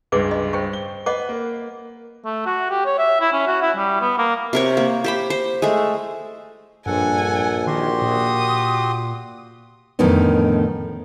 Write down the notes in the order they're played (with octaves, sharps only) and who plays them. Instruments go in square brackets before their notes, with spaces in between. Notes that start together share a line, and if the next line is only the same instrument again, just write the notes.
[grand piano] C#2 G2 G#3 [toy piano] G#4 B4 D6
[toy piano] D#5
C5 G5 C#6
[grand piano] G7
[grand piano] B4 [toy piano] D#5 F#5 D6
[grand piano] A#3
[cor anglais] A3
F#4
G4
C#5
E5
E4
C#4
F#4
E4
G3
B3
A#3
[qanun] C3 A#4 C#5
A#3
G4 C5 B5
C5
G#3 A3
[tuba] A#1 [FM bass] G2 [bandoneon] A4 F#5 [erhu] G#5
[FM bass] D#3 [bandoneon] F#4 G4 C6
[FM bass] A#2 [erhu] D#6
[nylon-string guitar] F2 A2 D3 D#3 B3 C#4